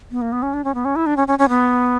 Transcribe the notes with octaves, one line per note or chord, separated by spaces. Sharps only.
B3
A#3
B3
C#4
D4
C#4
B3
C#4
E4
D4
C#4
C#4
C#4
B3